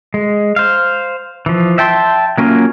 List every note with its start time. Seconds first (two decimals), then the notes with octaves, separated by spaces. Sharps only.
0.14 G#3
0.56 C5 F5
1.46 E3 F3
1.78 E5 G5 A5 C6
2.38 F#3 A#3 C#4 F4